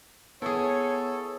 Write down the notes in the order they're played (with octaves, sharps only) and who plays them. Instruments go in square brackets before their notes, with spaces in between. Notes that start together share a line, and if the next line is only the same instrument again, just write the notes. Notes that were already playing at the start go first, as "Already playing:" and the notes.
[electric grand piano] B3 D#6 [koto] E4 G#4 [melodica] A4 [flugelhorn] C#5